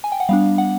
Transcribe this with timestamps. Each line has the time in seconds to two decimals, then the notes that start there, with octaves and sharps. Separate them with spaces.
0.04 G#5
0.12 G5
0.20 F#5
0.29 G3 B3 D4 F5
0.58 F#5